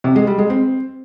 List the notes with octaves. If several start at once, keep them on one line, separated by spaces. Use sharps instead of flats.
C3
G#3
G3
G#3
C4